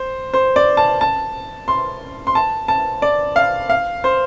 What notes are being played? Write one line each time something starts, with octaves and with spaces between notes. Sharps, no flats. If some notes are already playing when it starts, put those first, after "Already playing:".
Already playing: C5
C5
D5
A5
A5
C6
C6
A5
A5
D5
F5
F5
C5